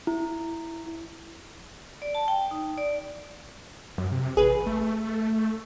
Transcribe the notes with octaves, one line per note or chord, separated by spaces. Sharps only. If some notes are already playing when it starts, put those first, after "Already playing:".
E4
D5
A5
G5
D#4
D5
F#2
C3
A1 G#4 B4
A3